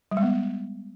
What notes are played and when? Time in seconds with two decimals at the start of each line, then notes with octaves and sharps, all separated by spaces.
0.11 G3
0.17 G#3
0.22 B3